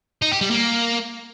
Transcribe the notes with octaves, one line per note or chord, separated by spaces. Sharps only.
D#4
G4
G3
A#3